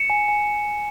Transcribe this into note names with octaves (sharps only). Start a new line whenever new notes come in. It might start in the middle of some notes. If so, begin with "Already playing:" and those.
Already playing: C#7 E7
G#5
G#5